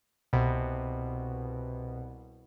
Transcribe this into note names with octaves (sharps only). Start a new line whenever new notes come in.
C2 B2